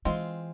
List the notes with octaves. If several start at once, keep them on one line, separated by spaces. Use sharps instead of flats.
E3 G#3 C4 F4